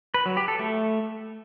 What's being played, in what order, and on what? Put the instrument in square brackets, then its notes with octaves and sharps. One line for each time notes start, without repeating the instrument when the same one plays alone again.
[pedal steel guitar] B4
F#3
G4
A4
A3